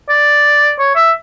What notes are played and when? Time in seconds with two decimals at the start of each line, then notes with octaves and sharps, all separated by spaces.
0.09 D5
0.79 C#5
0.96 E5